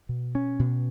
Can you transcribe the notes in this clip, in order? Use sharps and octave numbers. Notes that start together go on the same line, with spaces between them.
B2
C#4
B2